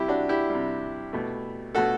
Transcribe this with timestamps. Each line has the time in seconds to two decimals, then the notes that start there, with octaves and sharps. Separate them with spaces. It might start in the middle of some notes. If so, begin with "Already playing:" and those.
Already playing: C3 G3 E4 G4
0.08 D4 F#4
0.29 E4 G4
0.50 C3 G3
1.13 B2 A3
1.75 B2 A3 F#4 A4